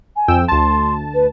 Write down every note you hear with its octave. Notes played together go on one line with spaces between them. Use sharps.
G#5
F2 G5 E6
D2 A5 C6
B4